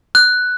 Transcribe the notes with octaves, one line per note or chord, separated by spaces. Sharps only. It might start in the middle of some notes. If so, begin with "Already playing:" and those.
F#6